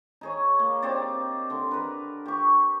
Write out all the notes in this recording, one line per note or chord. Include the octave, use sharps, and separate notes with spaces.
D#4 G#4 C#5
A#3
C4 D#4 G4 D5
D3 C6
A#4 B4
G4 C#6